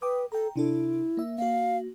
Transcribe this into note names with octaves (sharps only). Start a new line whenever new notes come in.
B4 G5 D6 D#6
A4 G5 A#5
C3 D4 E4 A4
A#3 E5
A#3 F#4 F5